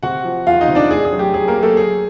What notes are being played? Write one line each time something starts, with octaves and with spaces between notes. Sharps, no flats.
C3 F#4 F#5
F3
E2 F4 F5
D#4 D#5
C3
D4 D5
A2 G#4
G#4
F#3
G4
F#3 G#4
A#3 A#4
F#3
A3 A4
F#3 G#4